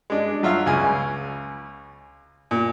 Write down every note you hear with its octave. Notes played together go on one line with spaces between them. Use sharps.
G#3 D4
F#3 F4 E5 F5
C#2 C#3 G#5
A#2